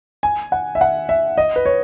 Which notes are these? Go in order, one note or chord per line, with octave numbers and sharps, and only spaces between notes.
G#5
F#5
E5
F#5
E5
D#5
B4
C#5